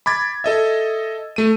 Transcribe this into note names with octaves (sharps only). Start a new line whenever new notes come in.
B5 D6 G#6 A6
A4 D#5 E5
A3 D#7